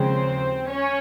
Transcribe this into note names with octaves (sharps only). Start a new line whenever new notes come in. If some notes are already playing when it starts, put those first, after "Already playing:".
Already playing: D#2 C#3 F3 G#3 C4 C5
C#4 C#5